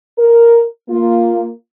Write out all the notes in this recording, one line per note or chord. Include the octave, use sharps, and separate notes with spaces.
A#4
A#3 F4